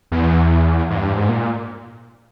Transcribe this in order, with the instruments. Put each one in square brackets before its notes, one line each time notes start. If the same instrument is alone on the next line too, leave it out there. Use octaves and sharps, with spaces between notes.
[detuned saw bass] E2
G#2
G2
G#2
A#2